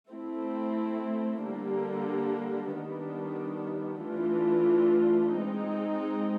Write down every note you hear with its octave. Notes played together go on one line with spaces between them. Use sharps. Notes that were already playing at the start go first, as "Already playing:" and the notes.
A3 C4 E4
D3 G3 A#3 D4
D#3 G3 B3 D4
E3 A3 D4 F4
G#3 C4 D#4